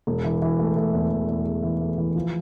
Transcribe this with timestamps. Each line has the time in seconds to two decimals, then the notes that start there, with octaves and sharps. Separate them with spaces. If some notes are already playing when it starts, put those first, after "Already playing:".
0.07 E1
0.24 E3
0.42 E3
0.59 A3
0.77 A3
0.93 E2
1.10 E2
1.28 E2
1.45 E2
1.63 E3
1.81 A3
1.98 E3
2.15 F3